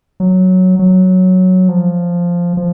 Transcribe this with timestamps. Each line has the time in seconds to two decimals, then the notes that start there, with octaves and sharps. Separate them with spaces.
0.20 F#3
0.79 F#3
1.69 F3
2.57 F3